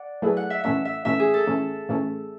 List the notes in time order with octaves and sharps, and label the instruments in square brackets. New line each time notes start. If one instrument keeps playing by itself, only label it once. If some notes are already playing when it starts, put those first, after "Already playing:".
Already playing: [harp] D5 F#5
[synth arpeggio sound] F#3 A3 E4 G#4 B4
[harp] F#5
E5
[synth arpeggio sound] A2 E3 A3 C#4 [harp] E5
[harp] E5
[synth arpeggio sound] A2 E3 A3 C#4 [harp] E5
[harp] G#4
A4
[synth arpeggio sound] A2 E3 A3 C#4
A2 E3 A3 C#4